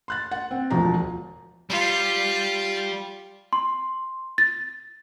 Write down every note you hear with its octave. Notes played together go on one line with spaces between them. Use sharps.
C6 F#6 A6
F#5
C4
E1 D2 F3 A#5
G3 F4
C6
A6